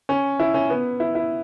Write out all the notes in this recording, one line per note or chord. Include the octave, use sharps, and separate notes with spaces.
C#4
E4
C#4
B3
E4
E4